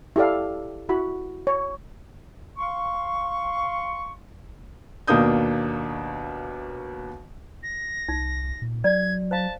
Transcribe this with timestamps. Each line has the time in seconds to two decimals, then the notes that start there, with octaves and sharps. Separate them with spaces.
0.16 E4 G4 A4 D5 F5
0.89 E4 F#4 B5
1.47 C#5
2.58 F5 C6 C#6
5.07 D#2 B2 A#3 D4 D#6 G6
7.63 A#6
8.08 C2 D#4
8.62 A#2
8.84 F#3 D5 G#6
9.31 C5 F5 A5